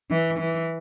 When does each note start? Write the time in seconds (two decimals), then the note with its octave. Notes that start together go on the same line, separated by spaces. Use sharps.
0.10 E3
0.39 E3